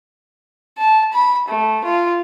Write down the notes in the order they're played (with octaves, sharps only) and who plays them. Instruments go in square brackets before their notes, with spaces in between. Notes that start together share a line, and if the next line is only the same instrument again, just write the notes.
[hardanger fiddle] A5
B5
A3
F4